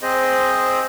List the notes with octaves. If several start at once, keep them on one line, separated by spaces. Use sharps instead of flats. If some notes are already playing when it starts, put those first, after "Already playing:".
C4 G#4 C5 D#5